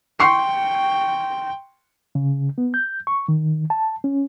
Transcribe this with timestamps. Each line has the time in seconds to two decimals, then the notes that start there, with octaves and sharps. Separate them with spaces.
0.20 G5 C6 C#6 C7
2.15 C#3
2.58 B3
2.74 G6
3.07 C#6
3.28 D#3
3.70 A5
4.04 C#4